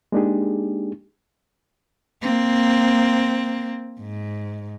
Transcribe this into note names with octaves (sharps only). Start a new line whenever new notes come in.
G#3 A#3 D4 D#4 G4 G#4
A#3 C4
G#2